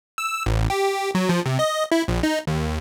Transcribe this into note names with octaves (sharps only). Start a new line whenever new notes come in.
E6
A1
G4
F#3
F3
C3
D#5
E4
A#1
D#4
D#2